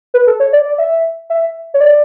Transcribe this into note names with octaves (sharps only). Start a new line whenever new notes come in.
B4
A4
C#5
D5
D5
E5
E5
C#5
D5